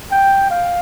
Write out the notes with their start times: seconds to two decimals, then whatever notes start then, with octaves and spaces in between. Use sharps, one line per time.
0.12 G5
0.51 F5